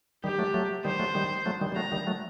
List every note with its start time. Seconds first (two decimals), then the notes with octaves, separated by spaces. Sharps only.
0.24 D#3 G3 G4
0.39 F#3 A3
0.54 F#3 A3
0.85 D#3 G3 C5
1.00 F#3 A3
1.15 D#3 G3
1.46 F#3 A3
1.61 D#3 G3
1.72 G3
1.76 F#3 A3 A#5
1.92 D#3 G3
2.07 F#3 A3